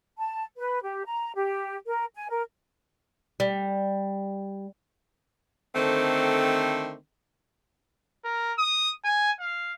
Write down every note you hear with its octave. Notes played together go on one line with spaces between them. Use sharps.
A5
B4
G4
A#5
G4
A#4
G#5
A#4
G3
D3 D#3 A3 C4
A#4
D#6
G#5
F5